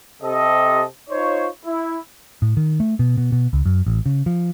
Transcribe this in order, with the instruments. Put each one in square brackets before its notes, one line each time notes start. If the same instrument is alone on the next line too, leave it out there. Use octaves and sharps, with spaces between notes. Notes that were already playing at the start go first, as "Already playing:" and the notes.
[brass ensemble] C3 A4 D#5
D#4 F4 C5 C#5
E4
[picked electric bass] A2
D#3
A3
B2
B2
B2
C#2
F#2
A1
C#3
F3